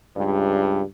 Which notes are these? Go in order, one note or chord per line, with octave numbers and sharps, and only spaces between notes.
C#2 G2